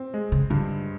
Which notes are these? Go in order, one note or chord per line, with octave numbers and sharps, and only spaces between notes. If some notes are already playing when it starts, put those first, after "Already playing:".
Already playing: C4
G#3
C#3
G2 D3